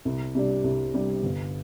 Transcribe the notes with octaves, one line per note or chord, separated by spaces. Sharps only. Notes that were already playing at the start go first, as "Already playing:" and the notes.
C2
C3 G3 D4
C2
C3 G3 D4
G1